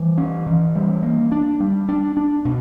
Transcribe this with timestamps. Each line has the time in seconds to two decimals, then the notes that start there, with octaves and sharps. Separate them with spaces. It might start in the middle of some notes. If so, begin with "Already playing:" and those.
Already playing: E3 G3
0.18 C#4
0.46 E3
0.76 G3
1.03 A#3
1.32 D4
1.60 G3
1.88 D4
2.17 D4
2.45 B2